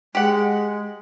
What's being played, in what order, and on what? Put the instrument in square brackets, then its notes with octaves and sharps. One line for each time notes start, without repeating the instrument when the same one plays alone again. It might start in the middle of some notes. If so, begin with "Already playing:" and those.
[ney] G#3 [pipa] G4 F#5